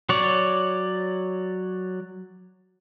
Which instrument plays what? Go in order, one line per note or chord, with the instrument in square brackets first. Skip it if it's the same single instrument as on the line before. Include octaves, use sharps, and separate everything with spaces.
[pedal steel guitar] F#3 C#5 D5